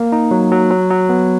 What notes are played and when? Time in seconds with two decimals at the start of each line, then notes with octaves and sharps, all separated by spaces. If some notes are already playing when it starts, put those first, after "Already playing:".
Already playing: A#3
0.12 D#4
0.31 F#3
0.51 F#3
0.70 F#3
0.91 F#3
1.09 B3